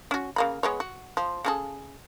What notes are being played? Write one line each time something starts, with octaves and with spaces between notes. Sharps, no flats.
C#4 F#4
C#3 A#3 B5
G#3 B3 C#5
F#4
F3
C#3 G#4 A4